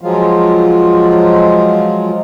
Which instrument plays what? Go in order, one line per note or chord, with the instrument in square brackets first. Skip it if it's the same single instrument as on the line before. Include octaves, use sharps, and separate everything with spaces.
[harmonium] F3 F#3 G#3 F4